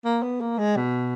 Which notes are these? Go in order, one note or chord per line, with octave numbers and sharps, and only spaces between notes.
A#3
B3
A#3
G#3
B2